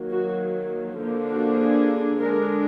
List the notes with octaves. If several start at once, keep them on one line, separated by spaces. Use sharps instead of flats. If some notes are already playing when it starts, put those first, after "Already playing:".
Already playing: D#3 F#3 A#3
F#4
D3 F3 A#3 D4
F#4
G#4
D3 G#3 D4 A#4